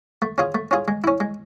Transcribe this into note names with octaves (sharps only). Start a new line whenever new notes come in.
A3
C#4 F4 G#4
A3
C#4 F4 G#4
G#3
C#4 E4
G#3